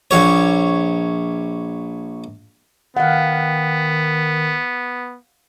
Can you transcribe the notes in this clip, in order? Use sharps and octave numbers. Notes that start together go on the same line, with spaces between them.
A#1 C#5
D#3 B3 F5 F#5